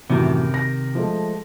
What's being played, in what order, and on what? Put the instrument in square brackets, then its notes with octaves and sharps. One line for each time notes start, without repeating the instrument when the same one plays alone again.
[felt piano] F#2 A2 E3 [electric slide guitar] C3 D#3
[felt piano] A#6
F3 G#3 A3